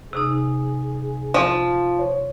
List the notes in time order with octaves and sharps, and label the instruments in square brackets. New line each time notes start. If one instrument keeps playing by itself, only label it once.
[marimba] C3 D#4 [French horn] G#4
[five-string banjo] F3
[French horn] C#5